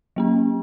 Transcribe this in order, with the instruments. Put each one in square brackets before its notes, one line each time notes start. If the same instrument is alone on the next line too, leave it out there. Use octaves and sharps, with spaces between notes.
[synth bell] F#3 A#3 C#4